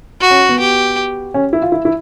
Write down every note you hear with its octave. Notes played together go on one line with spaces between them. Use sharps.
F#4
C#4
B3
G4
C#4
E4
F4
E4
E4